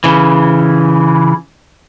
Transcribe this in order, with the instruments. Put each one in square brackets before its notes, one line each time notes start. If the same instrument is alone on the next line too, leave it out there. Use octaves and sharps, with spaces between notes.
[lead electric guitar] C#3 E3